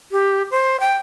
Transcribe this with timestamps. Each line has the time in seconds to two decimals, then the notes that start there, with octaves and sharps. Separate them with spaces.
0.12 G4
0.51 C5
0.80 G5